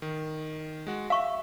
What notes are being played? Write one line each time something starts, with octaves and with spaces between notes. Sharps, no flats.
D#3
G#3 F#4
E5 F5 C#6